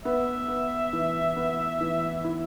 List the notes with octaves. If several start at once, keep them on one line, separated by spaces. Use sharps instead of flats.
B3 E5
B3
E3
B3
E3
E4